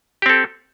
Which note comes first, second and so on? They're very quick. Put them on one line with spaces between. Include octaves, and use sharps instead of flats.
G4 C4 A4